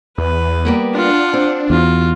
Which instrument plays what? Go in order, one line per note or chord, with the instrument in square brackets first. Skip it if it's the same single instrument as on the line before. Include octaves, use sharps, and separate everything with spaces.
[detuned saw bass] E2 [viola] B4
[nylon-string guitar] G3 A#3 B3
[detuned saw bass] D4 [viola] F4 F#5
[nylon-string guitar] C4
[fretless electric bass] E2 [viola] F4 F#4